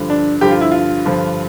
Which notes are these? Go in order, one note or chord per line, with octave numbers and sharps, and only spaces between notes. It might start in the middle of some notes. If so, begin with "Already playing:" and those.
Already playing: G2 D3 F3
D4
G2 D3 F3 G4
F4
E4
F4
G2 D3 F3